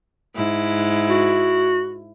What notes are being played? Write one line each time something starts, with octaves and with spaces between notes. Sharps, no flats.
G#2 E4
F#4